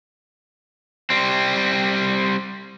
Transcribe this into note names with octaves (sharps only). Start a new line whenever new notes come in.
G3 C4